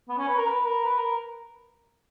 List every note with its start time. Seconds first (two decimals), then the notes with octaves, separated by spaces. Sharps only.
0.09 B3
0.18 C#4
0.28 B4
0.38 A#4
0.47 B4
0.66 A#4
0.85 B4
0.98 A#4